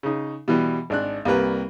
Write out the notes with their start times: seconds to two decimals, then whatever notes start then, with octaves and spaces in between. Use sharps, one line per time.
0.03 C#3 D#4
0.48 B2 E3 G3
0.90 G#1 D4 F#6
1.25 C2 G3 A#3 A#4 B4